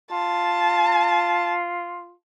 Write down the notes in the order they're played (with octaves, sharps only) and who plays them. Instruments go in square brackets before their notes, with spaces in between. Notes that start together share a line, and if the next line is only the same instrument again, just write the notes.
[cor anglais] F4 [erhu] A5